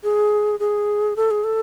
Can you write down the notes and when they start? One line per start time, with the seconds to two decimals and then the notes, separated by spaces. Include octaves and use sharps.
0.04 G#4
0.60 G#4
1.16 A4
1.31 G#4
1.44 A4